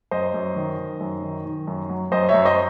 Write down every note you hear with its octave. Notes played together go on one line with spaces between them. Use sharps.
F#2 C5 D#5
F#2
D#3
D#3
F#2
D#3
D#3
F#2
F#3
F#2 C5 D#5
C#5 E5
F#2
C5 D#5